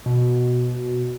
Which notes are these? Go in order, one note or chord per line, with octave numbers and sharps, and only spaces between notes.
B2